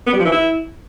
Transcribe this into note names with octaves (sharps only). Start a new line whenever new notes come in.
B3
G3
F3
E3
E4